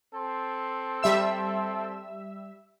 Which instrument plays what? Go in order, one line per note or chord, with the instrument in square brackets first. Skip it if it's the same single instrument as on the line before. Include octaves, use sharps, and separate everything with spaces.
[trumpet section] C4 A4 C6
[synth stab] G3 E5 E6